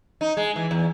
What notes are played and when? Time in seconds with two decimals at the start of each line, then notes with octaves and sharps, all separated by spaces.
0.21 D#4
0.37 G#3
0.56 E3
0.71 E2